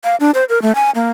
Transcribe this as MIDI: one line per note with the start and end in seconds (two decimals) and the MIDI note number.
0.04 0.16 77
0.20 0.31 62
0.34 0.44 72
0.49 0.61 70
0.62 0.74 57
0.75 0.90 80
0.95 1.11 58